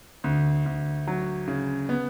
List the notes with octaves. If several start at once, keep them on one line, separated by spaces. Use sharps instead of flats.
D2
D2
F#3
C#3
B3